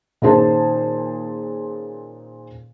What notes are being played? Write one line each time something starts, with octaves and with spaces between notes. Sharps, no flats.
A#2 D#3 C#4 G#4 C5 A5